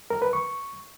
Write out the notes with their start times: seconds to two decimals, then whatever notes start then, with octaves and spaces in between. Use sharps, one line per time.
0.10 A#4
0.22 B4
0.33 C#6